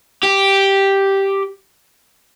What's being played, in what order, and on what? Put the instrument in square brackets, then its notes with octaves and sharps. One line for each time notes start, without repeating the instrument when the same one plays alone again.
[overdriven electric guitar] G4